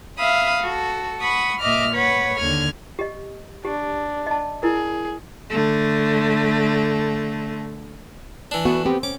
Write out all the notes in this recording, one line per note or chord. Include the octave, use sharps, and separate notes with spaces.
E5 F5 B5 D#6
F#4 A4
F#5 B5 C#6 D#6
A#2 D#5 E5 D6 F6
B4 C#5 F#5
D#2 D3 F6 G#6
G4 D#5
D4 G4
D#5 A5
E4 G#4 A#4
D3 A3
E3 D4
A3 B3 F#4
B3 C4 G4
C#4 D6